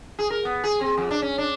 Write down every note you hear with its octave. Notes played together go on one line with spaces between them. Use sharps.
G#4
A#4
B3
G#4
C4
F2
D4
C#4
D4